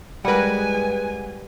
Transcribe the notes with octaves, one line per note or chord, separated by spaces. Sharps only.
G3 G#3 A#4 B4 F#5 G#5